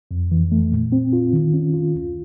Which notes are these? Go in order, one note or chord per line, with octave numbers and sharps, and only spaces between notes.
F2
E3
A3
A#2
C4
F4
D#3
C#4
F4
D2